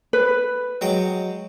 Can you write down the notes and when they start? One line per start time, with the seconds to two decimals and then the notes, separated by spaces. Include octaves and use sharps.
0.13 B4
0.81 F#3 G#3 G5